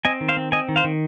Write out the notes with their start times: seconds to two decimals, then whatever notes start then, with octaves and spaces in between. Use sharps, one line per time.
0.05 C4 D#5 G#5
0.21 D#3
0.28 C5 F5
0.37 C4
0.52 C4 D#5 G#5
0.69 D#3
0.76 C5 F5
0.84 D#3